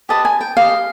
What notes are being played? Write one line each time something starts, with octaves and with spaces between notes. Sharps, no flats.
G4 B4 D#5 A5
G#5
G5
G4 B4 D#5 F5